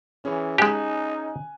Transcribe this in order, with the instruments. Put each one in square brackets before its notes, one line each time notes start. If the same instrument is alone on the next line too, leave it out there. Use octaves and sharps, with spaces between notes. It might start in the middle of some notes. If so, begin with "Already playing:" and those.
[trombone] E3 [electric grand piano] C#4 G#4 C#5
[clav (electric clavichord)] G#3 G4 [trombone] D#4 [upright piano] G#5 F#6 E7